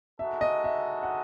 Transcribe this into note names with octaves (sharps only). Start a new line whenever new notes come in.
G#3 D#4 F#4 A4 E5
D#5
E5
F#5